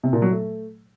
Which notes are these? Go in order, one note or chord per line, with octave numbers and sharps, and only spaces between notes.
C3
A#2
F#3
A3